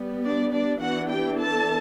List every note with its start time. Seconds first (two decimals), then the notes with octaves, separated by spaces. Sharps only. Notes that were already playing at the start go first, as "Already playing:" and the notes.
Already playing: G3 B3
0.24 D4 D5
0.53 D4 D5
0.81 E3 B3 D4 F#4 F#5
1.10 G4 G5
1.38 A4 A5